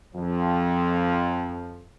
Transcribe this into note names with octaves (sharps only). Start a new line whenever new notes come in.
F2 F3